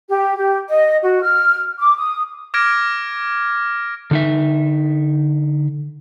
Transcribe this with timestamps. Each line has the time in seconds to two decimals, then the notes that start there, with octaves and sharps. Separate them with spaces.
0.10 G4
0.37 G4
0.69 D#5
1.02 F#4
1.22 F6
1.79 D6
1.98 D#6
2.54 D6 F6 G#6 A#6 D7
4.11 D3 D#4 E5